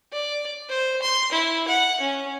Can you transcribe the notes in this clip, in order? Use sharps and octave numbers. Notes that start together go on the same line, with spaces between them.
D5
C5
C6
E4
F#5
C#4